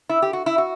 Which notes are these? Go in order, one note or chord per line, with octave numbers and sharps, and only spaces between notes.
E4
G4
F#4
E4
F#4